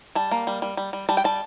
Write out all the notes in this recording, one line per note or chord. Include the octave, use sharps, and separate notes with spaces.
G3 A5
A#3
G3
G3
G3
G3
G3 A5
G5
G3 A5